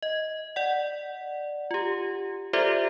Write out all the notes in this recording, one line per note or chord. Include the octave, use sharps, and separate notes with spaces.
D#5
D5 F#5
F4 G4
F4 G4 A4 C5 D5 E5